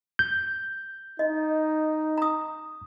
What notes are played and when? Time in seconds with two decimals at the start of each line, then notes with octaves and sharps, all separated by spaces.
0.19 G6
1.19 D#4 D#5
2.18 A#5 D#6